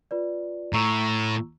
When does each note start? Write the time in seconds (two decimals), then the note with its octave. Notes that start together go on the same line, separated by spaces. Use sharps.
0.11 F4 B4 D5
0.73 A2 A#5 C#6 E6